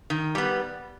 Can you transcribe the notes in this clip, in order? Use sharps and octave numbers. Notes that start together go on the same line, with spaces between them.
D#3
G3 B3